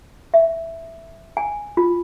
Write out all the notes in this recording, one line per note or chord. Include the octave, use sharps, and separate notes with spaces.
E5
G#5
F4